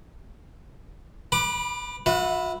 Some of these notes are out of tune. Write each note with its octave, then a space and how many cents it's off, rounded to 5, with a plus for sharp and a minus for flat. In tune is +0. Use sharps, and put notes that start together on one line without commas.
B4 +0 B5 -30 D6 +25
F#4 -40 B4 +0 E5 +0